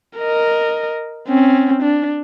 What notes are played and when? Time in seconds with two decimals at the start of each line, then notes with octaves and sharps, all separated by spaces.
0.18 A#4 D#5
1.28 C4 C#4
1.82 D4